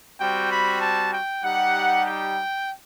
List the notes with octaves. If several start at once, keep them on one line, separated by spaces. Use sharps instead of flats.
G3 C4 F#4 G5
B5
A5
G5
G3 D#4 G4 F#5
G5